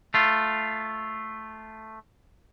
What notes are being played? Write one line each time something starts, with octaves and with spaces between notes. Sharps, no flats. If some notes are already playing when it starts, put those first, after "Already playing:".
A3 F4